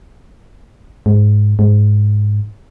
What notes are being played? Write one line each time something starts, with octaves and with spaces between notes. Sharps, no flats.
G#2
G#2